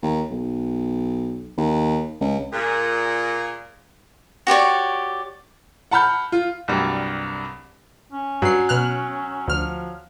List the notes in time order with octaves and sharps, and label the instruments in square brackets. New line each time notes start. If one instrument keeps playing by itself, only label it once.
[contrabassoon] D#2
B1
D#2
C#2
[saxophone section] A#2 G#4
[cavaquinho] F#4 G4 C#5 D5
[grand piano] F#5 A5 B5 F6 G6
F4
[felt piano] C2 G2 F#3 G3
[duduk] C#4
[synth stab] G2 C7 [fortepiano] F#3
[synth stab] B2 F6 F#6
[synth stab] D2 F6 [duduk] F3